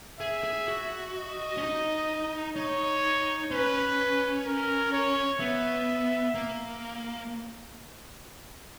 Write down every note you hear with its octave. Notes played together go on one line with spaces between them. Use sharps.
G#4 E5
G#4
F#4
D#5
C#4
D#4
D#4 C#5
C#4 B4
A#4
C#5
B3 E5
A#3